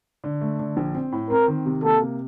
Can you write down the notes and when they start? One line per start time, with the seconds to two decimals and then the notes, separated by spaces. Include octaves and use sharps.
0.24 D3
0.41 A3
0.59 D3
0.77 A#1
0.95 C4
1.12 A2
1.30 C4 A#4
1.48 D#3
1.66 C3
1.84 A#3 A4
2.02 C3